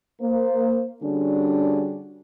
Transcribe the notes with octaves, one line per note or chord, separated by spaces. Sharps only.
A#3 C5
D3 G3 C#4 D4 F#4 G#4